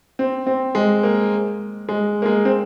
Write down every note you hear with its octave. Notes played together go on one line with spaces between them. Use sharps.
C4
C4
G#3
A#3
G#3
A#3
G#3
C4